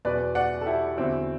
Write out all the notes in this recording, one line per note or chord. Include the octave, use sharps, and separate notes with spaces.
E2 B2 F#3 B4 D5
D5 F#5
A4
E4 G4
E2 D3 F#3 C4 E4